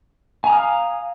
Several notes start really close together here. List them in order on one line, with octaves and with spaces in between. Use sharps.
G#5 A#5 D#6 F6 F5